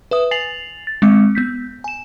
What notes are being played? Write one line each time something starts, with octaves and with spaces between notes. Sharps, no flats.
B4 E5 D#6
G#5 A6 C7 F7 F#7
A6
G#3 C4 D6 C#7
B3 G6 B6
G#5 E7